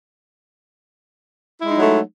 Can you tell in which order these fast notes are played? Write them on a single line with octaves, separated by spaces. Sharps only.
E4 G#3 D#4 F#3 A3